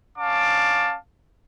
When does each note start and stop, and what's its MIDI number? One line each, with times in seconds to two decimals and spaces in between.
0.19 0.96 61
0.19 0.96 77
0.19 0.96 81
0.19 0.96 86